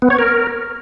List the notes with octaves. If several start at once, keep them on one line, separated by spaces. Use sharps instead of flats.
B3
C#5
A#4